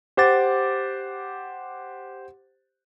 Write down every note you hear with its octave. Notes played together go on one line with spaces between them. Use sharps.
G4 C5 F#5 D6 A6